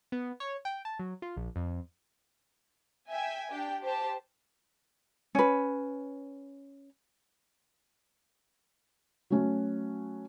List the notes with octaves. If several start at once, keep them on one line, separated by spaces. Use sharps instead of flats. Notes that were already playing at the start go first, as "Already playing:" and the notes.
B3
C#5
G5
A5
F#3
F4
A#1
F2
E5 G5 G#5
D4 G4 G5
G4 C5 A5
C#4 B4
F#3 A3 C#4 F#4